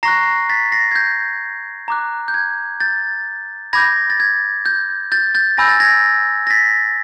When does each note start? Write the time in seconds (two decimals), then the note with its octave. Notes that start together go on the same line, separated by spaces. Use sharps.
0.03 A#5 C#6 F#6 A#6 C7
0.49 A6 B6
0.72 A#6 C7
0.91 G#6
0.96 G6
1.88 A#5 D6 F#6
2.28 G6
2.34 G#6
2.80 G6 A6
3.73 B5 D6 G6 G#6 A#6
4.10 A6
4.20 G#6
4.66 G6
5.12 G6 A6
5.35 G6 A6
5.58 G#5 B5 E6 G6 A#6
5.69 A6
5.80 G#6 A#6
6.47 A#6
6.50 A6 B6